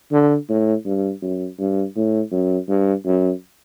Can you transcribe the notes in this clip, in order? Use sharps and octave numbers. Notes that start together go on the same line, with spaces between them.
D3
A2
G2
F#2
G2
A2
F#2
G2
F#2